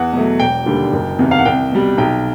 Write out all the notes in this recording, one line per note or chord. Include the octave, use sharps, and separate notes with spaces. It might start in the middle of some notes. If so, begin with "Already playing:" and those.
Already playing: E2 F#5
B2 F#3 A3
E1 G5
D#2 D3 G3
F#1
E2 C3 D#3
F5
F#5
C2 G5
B2 G3
B1 G5